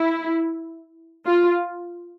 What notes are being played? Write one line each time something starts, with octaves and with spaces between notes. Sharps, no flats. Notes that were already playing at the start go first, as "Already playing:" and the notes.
Already playing: E4
F4